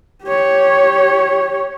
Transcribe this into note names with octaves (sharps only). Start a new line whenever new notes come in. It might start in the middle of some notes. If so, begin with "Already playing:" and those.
G4 C#5